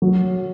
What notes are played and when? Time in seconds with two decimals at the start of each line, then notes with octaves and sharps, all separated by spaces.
0.02 F#3